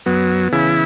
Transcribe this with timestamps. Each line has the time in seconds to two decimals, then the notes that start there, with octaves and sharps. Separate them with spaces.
0.06 F#2 F#3 B3
0.52 C#3 E3 E4